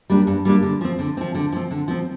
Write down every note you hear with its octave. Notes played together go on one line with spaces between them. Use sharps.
G3 A#3 D4
G2
G3 A#3 D4
D3
F3 C4
D3
F3 C4
D3
F3 C4
D3
F3 C4